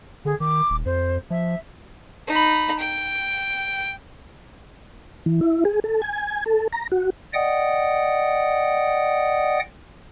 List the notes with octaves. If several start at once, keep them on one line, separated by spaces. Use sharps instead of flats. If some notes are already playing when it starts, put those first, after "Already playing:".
D3 G#4
D#3 D6
D#1
F2 C5
F3 E5
D#4 B5
G5
E3
E4
G#4
A4
G#5
A4
A#5
F#4
D5 D#5 F#5 G5 D#6